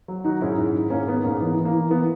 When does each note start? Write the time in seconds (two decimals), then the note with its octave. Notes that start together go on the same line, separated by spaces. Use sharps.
0.08 F#3
0.24 D#3 D#4 F#4
0.41 G#2 C#4 E4
0.58 G#2
0.75 D#3
0.90 G#2 A#3 C#4
1.07 D#3 B3
1.24 G#2 A#3 C#4
1.40 E3 B3
1.57 E3
1.65 A#3
1.74 E3
1.90 E3 B3